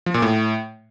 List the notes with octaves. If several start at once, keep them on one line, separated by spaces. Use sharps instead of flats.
F3
A#2
A2